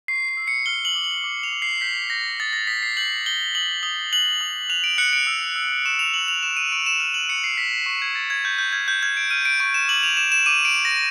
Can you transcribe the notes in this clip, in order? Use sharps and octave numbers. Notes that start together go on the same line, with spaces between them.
C#6 C7
C7
E6
C#7
F6 G7
F#7
D6
F#7
D6
F7
D6
C7
G6 B6
G6 A#6
D#6 A6
A#6
D#6 B6
C7
G6 F#7
G6 G7
D#6 F#7
D#6 G7
F#6 F#7
D#6
F#6 F7
D7
F#6 C#7
D7
E6
E6
C#6 E7
F7
C#6 F#7
F7
C#6 E7
D#7
C#6 D7
E7
F6 F#7
F#7
C#6 C#7
C7
F6 B6
C7
C#6
G#6
C#6 A6
G#6
C#6 G6
G6
F6 G#6
G6
F6 G#6
D7
F6 D#7
D7
C#6 D7
E7
D6 F#7
F7
D6 E7
E7
D6 D#7
D7
D6
A#6